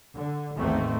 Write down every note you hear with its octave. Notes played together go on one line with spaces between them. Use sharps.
D3
A1 E2 D#3 A3 A#3 C4